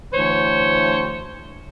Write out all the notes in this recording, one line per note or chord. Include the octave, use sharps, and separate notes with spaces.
D2 E3 C5 C#5